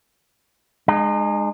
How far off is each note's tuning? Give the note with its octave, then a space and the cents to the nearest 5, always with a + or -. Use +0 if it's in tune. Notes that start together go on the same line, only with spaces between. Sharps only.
G#3 +0 D#4 -40